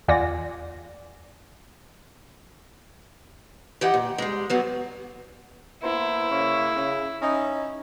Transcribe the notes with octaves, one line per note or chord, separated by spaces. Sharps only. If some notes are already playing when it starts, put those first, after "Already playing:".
E2 F4 D5 F#5 G#5 A#6
E3 G4 D#5 F#5
A#2
G3 G#3
G2 F#3 B3
A#3 B3 E4 C5
C#3 A#3 C#5
C#3
C#4 D#4